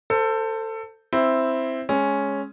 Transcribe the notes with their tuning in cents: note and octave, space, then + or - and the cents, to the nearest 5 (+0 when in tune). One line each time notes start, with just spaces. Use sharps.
A4 +20 C5 -10
C4 +0 E4 +0 C5 +0
G#3 +5 C#4 +0